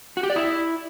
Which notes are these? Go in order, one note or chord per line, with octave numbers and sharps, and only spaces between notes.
F#4
G4
D5
E4